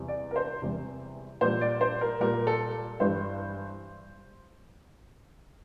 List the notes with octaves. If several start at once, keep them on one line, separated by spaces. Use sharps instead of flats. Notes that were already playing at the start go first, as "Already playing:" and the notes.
Already playing: E2 C3 E3 G3
D5
A#4
C5
E2 C3 E3 G3
A#2 G3 C5
D5
C5
A#4
A#2 G3 A#4
A4
G2 E3 G3 C5